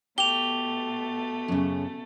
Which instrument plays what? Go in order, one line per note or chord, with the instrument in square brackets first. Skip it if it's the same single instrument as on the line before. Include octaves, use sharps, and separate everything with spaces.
[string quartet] B2 A3 [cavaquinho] G4 [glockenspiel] F7 G7
[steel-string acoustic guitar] F#2 C#3